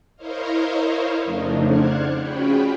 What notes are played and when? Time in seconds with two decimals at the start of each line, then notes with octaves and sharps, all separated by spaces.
0.16 E4 A#4 C5 C#5 D#5 F5
1.25 F2 C#3 F3 A3 D4 D#4
1.62 C5 D5 F#5 F6 F#6 G#6
2.18 C#4 F4 F#4 G#4 G5 B5